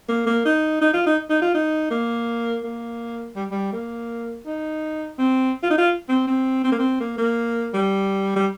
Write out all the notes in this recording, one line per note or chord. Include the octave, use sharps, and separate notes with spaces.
A#3
A#3
D#4
D#4
F4
D#4
D#4
F4
D#4
A#3
A#3
G3
G3
A#3
D#4
C4
F4
D#4
F4
C4
C4
C4
A#3
C4
A#3
A#3
G3
G3